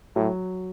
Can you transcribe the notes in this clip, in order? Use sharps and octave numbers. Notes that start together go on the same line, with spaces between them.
A2 F#3